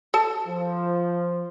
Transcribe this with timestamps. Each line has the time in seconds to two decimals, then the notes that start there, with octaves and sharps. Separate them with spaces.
0.14 A4 A5
0.47 F3